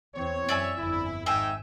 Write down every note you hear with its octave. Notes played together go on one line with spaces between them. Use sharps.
E2 E3 C4 C#5
F#2 D5 E5 G#5
G1 F2 E4
G#1 G#2 D#4 E5 G5 G#5